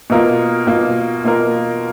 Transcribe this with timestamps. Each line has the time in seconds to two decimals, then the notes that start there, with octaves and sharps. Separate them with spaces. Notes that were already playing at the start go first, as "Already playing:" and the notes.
0.10 B2 A#3 F4 A#4
0.67 B2 A#3 F4 A#4
1.25 B2 A#3 F4 A#4